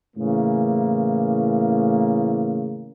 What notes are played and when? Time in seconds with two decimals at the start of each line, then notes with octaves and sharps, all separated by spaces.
0.16 A2 C#3 E3 A#3